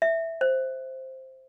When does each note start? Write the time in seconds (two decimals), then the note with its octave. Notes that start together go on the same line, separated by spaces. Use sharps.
0.02 E5
0.41 C5